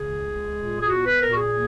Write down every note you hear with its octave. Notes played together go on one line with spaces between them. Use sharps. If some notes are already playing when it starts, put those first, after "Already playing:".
Already playing: C#2 C#3 G#4
G#3
A#2
G#4
B3 F#4
B4
A#2 A#4
F#4
G#4
A#3